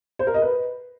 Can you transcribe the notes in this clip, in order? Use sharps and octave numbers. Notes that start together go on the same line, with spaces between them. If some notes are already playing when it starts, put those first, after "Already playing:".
C5
A#4
D#5
B4